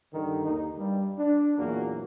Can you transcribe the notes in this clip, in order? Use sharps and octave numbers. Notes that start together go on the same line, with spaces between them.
G2 D3 D#3
D#2 A#3 D#4
G2 G3
D4
E2 A#2 F#3 A#3 F#4